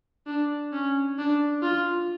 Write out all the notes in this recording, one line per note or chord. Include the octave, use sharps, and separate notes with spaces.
D4
C#4
D4
F4